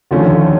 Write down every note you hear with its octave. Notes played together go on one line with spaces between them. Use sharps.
D#2 D3 F3 A3 C#4